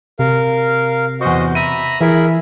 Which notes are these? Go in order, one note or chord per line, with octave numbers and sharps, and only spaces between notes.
C3 A#4 F5
E2 F#4 C5 D#5 C#6
E5 A#5 B5 D#7
E3 E4 G#4 A#4 B5